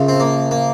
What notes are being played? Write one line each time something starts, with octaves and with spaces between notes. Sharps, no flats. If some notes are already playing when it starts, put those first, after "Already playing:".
Already playing: F#2 C#3 F3
C4
A#3
A#3